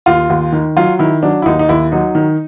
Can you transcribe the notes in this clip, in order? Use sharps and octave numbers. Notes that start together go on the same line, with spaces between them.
D#2 F4
D#2
D#3
F#3 F4
D#3 E4
F#3 D4
E4
D#2 D#4
D#4
D#2 E4
F#3 D#4
D#3